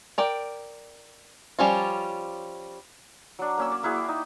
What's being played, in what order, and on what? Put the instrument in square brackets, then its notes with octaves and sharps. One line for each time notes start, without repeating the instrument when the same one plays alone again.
[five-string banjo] A#4 D5 G5
F3 G3 C#4 F4
[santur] F#3 D4
A#3 C#4 E6
D5
A#3 E4 F#4 G#4
G5
D#4